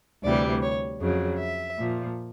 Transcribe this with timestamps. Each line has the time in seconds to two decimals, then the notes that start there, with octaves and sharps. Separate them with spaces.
0.23 D2 C3 E3 G3 D5
0.62 C#5
1.00 F2 C#3 F#3
1.39 E5
1.78 A#2 F3